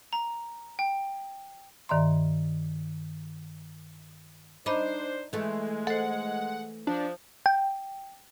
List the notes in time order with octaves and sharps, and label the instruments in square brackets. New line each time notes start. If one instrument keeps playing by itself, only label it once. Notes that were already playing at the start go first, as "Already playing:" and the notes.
[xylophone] A#5
G5
[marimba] G2 D#3 D5 E5 A#5 C6
[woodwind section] D4 C5 [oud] D#4 [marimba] D#5 B5 D6
[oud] E3 A3 [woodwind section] G#3
[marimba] A4 C5 [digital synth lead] F#5
[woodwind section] F3 [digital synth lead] D4
[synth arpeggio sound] G5